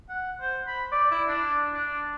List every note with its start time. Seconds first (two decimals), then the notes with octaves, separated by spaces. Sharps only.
0.09 F#5
0.41 C5
0.67 B5
0.91 D5
1.11 E4
1.28 D4
1.74 D4